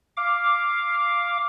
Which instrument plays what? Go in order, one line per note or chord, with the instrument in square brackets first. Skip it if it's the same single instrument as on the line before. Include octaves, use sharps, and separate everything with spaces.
[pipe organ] F5 D6